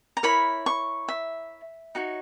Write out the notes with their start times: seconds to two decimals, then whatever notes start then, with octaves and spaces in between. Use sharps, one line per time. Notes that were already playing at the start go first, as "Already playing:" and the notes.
0.17 A#5
0.23 E4 A#4 C#5 B5
0.66 C#6
1.08 E5
1.95 D#4 F#4 C#5